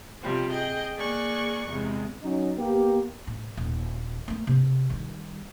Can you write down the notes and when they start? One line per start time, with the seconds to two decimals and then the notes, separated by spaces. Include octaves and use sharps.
0.22 C3 F3 G3 C4
0.50 G#4 D#5 G5
0.95 A#3 G#4 D5 C#6 F#6
1.68 E2 C3 G#3
2.23 F#3 C#4 D#4
2.57 A#3 B3 G4
3.27 A2
3.57 D#1
4.28 A3 A#3
4.47 C3
4.90 D#3 G3